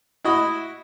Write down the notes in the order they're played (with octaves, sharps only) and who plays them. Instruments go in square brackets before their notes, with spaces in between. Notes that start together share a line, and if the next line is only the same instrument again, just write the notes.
[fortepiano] E4 F#4 D#5 B5 C#6